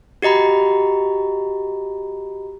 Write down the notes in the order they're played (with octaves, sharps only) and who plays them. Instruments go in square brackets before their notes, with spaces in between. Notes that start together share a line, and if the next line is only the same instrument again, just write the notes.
[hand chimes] F#4 G4 D#5 A#5 B5